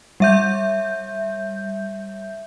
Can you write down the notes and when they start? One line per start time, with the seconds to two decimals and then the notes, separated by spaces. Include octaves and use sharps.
0.20 G3 E5 G6